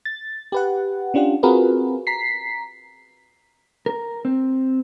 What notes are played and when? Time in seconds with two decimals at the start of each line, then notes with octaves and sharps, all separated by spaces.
0.05 A6
0.52 G4 B4 F#5
1.14 C#4 D4 F4 G4 F#5
1.43 C4 F4 F#4 G#4 A#4 B4
2.07 A#5 B6 C7
3.86 A#4
4.25 C4